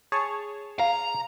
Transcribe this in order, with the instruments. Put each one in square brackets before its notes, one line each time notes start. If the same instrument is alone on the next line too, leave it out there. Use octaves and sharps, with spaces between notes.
[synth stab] G#4 C#5 A5
[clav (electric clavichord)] F5 [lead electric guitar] A#5